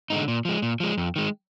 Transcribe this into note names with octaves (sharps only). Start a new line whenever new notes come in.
D3 G#3 D#4
A#2
F3 G#3
A#2
F3 G#3
F2
D#3 G#3